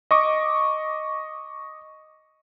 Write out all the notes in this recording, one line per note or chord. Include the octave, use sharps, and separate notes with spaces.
D#5 C#6 D6